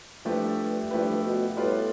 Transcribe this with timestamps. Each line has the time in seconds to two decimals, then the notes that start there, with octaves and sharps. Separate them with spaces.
0.25 G2 F3 A3 E4 G4 B4
0.91 G2 F3 A3 E4 G4 B4
1.24 B2
1.57 A2 G3 B3 F4 B4 D5